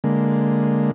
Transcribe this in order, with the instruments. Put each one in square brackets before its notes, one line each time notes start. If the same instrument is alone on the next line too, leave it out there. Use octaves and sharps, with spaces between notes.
[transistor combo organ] D3 G#3 A#3